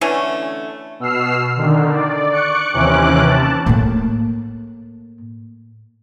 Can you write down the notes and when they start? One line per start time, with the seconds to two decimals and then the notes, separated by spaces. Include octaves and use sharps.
0.01 D3 E3 A3 C#4
1.00 B2 E6 F6 C7
1.56 D3 D#3
1.92 D5
2.33 C#6 D6 F#6 C#7
2.73 D#2 C3 E3 C#4 D6 F#6
3.26 A5
3.66 A2 A#3